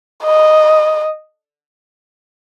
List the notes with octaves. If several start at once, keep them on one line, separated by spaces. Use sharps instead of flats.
D#5